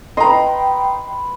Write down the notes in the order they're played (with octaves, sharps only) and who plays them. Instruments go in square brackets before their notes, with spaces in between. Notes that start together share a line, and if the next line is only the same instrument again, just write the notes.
[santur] B4 C6 [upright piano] D#5 A#5 [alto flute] G5